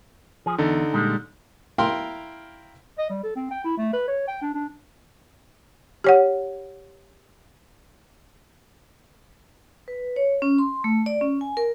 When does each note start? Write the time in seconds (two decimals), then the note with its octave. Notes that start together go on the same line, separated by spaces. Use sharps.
0.46 F3 G#4
0.58 E2 D3 D#4 A4
0.93 A#2 G3 G#3
1.78 E4 A#4 F5 G5 C6
2.98 D#5
3.10 G3
3.23 A4
3.36 C4
3.51 G5
3.64 E4
3.78 A3
3.93 B4
4.08 C#5
4.28 G5
4.42 D4
4.54 D4
6.04 G4 C#5 F#5
9.88 B4
10.16 C#5
10.42 C#4
10.58 C6
10.84 A3
11.06 D5
11.21 C#4
11.41 G#5
11.57 A#4